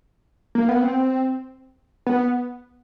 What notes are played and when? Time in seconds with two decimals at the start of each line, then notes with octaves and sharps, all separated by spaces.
0.55 A#3
0.69 B3
0.82 C4
2.07 B3